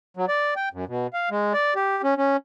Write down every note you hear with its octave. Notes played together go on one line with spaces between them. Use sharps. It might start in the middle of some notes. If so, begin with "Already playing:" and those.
F#3
D5
G5
F#2
B2
F5
G#3
D5
G4
C#4
C#4